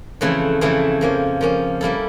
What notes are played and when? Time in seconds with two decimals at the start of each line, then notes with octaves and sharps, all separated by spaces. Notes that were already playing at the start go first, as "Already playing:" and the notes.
0.21 F2 C#3 E3 A3 E4
0.61 F2 C#3 E3 A3 E4
1.01 F3 A#3 C#4
1.41 F3 A#3 C#4
1.81 G3 A#3 E4 A4